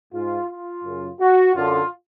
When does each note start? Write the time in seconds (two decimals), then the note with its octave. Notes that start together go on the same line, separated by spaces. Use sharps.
0.13 G#2 F4
0.49 F4
0.84 F#2 C#3
1.20 F#4
1.56 F#2 D3 F4